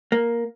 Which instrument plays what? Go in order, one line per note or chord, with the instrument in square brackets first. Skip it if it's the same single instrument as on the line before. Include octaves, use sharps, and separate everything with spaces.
[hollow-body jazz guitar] A#3